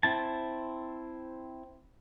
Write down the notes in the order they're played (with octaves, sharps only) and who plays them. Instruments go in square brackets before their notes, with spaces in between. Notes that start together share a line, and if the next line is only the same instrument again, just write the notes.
[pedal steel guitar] C4 E4 A5